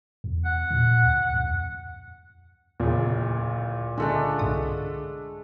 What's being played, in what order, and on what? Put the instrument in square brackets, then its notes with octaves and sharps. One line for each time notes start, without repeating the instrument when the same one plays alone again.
[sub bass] E2
[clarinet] F#5
[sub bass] A#2
D2
F2
[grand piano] D1 [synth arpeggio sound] E2 C#3 [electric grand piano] A#2
[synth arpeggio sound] C#2 [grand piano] D3 [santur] G#3 A3 D4
[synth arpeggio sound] C2 G#2 D#6